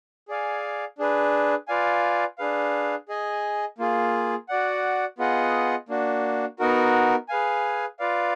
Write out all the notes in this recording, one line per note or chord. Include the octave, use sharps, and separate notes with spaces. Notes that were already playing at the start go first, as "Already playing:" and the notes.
G#4 D5 F5 G#5
D4 G#4 B4
F4 B4 D5 F5 G#5
D4 G#4 B4 F5
G#4 D#5 G#5
A#3 F4 G#4
F#4 D5 F#5
B3 F4 G#4 D#5 F#5
A#3 D4 F#4
B3 D#4 F#4 A#4
G#4 B4 F5 G#5
F4 B4 D5 F5